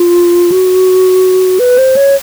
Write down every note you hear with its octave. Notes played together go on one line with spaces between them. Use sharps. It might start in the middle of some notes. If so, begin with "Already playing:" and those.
Already playing: F4
F#4
B4
C5
C#5